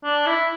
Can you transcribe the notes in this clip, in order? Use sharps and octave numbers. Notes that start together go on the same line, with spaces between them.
D4
E4